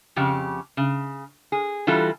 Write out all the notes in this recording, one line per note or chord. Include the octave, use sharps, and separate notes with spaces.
F2 C#3 G4
C#3
G#4
E3 G3 F4 F#4 A4